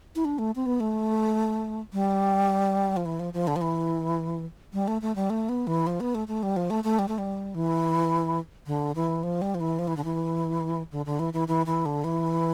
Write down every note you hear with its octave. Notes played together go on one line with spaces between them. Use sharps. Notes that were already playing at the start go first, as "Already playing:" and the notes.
E4
D4
A3
C4
B3
A3
G3
F3
E3
F3
F3
D3
F3
E3
G3
A3
A3
G3
A3
B3
E3
F3
B3
A3
A3
G3
F3
A3
A3
G3
A3
G3
E3
D3
E3
F3
G3
F3
E3
F3
E3
D3
E3
D3
D3
E3
E3
E3
E3
D3
E3